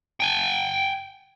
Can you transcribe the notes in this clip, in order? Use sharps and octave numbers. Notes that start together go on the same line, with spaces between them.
G5 G#5